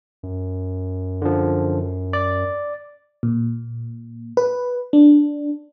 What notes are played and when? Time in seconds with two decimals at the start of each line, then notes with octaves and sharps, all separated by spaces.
0.23 F#2
1.22 D3 F3
2.13 D5
3.23 A#2
4.37 B4
4.93 D4